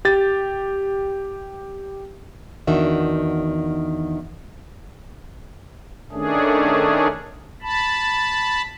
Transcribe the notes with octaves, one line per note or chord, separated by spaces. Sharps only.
G4 A6
E2 D#3 D4 F#4 E5
D#3 A3 C#4 D4 G#4
A5 B5